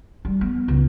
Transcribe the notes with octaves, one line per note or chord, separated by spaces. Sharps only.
G3
B3
C#2